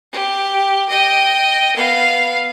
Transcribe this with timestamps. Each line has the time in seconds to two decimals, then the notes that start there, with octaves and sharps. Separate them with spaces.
0.12 G4
0.89 D#5 G5
1.76 B3 F5